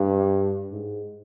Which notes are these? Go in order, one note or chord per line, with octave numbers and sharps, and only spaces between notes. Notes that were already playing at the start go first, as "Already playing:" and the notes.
Already playing: G2
G#2